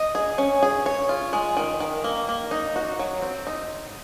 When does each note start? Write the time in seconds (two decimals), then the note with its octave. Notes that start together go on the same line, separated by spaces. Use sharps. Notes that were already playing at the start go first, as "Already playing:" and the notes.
Already playing: D#5
0.15 G#4
0.38 C#4
0.63 G#4
0.86 C#5
1.09 F4
1.33 G#3
1.57 D#3
1.80 D#3
2.04 A#3
2.29 A#3
2.51 D#4
2.76 F#4
2.99 F#3
3.22 C4
3.47 D#4